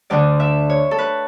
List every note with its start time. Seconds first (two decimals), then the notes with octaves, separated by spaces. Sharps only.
0.10 D2 D3 D5
0.40 E5
0.70 C#5
0.91 A4
0.98 B4